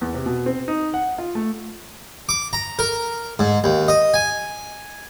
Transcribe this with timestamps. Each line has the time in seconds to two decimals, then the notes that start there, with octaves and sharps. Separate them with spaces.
0.01 E2
0.14 C3
0.26 B2
0.46 C4
0.68 D#4
0.94 F#5
1.18 F4
1.35 A3
2.29 D6
2.53 A#5
2.79 A#4
3.39 G#2
3.64 D#2
3.88 D#5
4.14 G#5